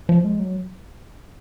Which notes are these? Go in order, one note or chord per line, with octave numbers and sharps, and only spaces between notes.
F3
G#3
F#3